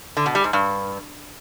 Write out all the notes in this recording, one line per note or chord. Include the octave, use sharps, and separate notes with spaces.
D3
B2
G3
G#2
G2